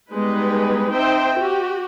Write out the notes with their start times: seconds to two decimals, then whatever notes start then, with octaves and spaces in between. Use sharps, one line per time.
0.11 G3 G#3 B3 D#4 B4
0.91 C4 D#4 C5 E5 G5
1.38 F#4 G4